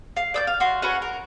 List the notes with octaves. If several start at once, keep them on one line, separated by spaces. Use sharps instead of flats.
F5
D5 E6 G6
F5
F#4 C6
C#4 F#4 B4 F#5
A#4